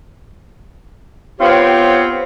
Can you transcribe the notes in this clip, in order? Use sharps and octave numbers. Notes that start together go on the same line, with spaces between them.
B3 C4 F4 G4 C5 C#5